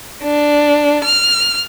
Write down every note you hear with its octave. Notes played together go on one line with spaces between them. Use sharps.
D4
F6